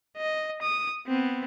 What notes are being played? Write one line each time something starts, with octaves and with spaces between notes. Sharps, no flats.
D#5
D#6
B3 C4